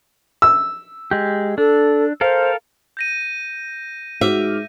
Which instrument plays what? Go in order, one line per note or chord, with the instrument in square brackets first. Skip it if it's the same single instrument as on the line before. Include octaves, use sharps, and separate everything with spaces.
[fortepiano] E6
[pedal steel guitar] G#3 G4
[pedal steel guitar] D4 [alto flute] A4
[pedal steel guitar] A4 A#4 F5 [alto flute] C5
[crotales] G6 A#6 D#7
[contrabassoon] G#2 [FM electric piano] F#4 D6 F6 [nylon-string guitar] E5